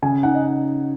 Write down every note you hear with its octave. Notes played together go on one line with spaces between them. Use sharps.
C#3 G#5
D#4 F#5
D#5